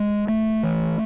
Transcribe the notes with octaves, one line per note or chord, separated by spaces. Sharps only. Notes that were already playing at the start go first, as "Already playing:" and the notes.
Already playing: G#3
A3
E3